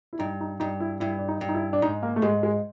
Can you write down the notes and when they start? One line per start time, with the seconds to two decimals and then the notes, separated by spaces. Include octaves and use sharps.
0.13 E4
0.19 G2 D#4
0.40 D#4
0.60 G2 D#4
0.80 E4
1.00 G2 E4
1.19 D4
1.28 D#4
1.41 G2
1.49 D#4
1.54 E4
1.73 D4
1.82 G#2 D#4
2.03 A#3
2.16 A3
2.22 G#2 G#3
2.43 G#3